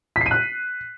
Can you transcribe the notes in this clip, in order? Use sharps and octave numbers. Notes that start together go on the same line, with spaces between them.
B6
C7
D#7
F#6